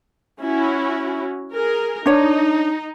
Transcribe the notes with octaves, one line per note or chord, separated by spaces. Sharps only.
C#4 E4 F#4
G#4 A#4
D4 D#4 C#5